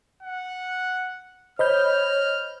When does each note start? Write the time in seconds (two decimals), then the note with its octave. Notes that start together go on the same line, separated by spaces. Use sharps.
0.23 F#5
1.59 C5 C#5 D#5 B5 F6 G6